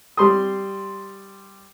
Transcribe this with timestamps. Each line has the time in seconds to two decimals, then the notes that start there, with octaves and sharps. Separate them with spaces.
0.17 G3 C6 D#6